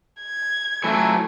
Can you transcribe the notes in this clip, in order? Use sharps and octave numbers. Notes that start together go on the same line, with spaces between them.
G#6
E3 F#3 A3